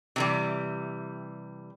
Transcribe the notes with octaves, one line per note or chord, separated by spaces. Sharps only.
C3 E3 G3